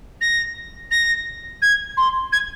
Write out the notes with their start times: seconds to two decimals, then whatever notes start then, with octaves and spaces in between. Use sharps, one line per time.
0.21 A#6
0.91 A#6
1.62 G#6
1.97 C6
2.32 G#6